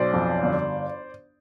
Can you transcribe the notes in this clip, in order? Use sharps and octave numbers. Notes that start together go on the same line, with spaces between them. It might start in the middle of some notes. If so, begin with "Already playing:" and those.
Already playing: B1 C5 D5
F2
G1